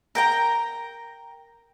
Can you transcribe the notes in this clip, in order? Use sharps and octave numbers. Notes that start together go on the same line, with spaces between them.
A#4 G5 A#5